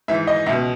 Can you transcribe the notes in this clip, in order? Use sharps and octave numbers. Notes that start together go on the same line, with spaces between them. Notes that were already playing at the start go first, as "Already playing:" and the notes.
G#2 E3 E5
D#5
C#2 B2 E5